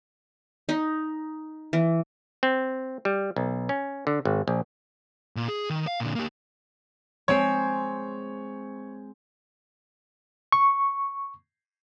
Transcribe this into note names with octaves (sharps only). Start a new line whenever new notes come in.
D#4
E3
C4
G3
B1
C#4
D3
G#1
A#1
A#2
G#4
D#3
F5
A#2 D3
A#3 G4
G#3 C4 C#5
C#6